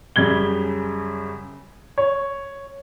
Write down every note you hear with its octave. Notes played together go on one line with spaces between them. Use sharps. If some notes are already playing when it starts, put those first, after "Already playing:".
F#2 C#3 G3 G#6 G7
C#5